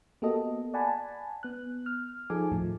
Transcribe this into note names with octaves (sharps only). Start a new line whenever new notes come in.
A#3 B3 F#4 G4 A4 D#5
D5 F#5 G#5 A5 B5
B3 F#6
F6
F3 D#4 G#4 A4 G#5 D6
D#2 A2 F3 A3